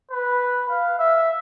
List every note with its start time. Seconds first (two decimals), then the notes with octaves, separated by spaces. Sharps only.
0.11 B4
0.70 F5
0.99 E5